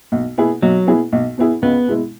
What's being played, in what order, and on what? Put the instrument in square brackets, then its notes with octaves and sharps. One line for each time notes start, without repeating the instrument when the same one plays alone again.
[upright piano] B1
B2 B3 E4 G#4
[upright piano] B1 [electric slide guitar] F#3
[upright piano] B2 B3 E4 G#4
B1
B2 B3 E4 G#4
[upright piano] C#2 [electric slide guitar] B3
[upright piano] B2 G#3 E4